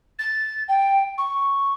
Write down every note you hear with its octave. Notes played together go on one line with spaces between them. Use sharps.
A6
G5
C#6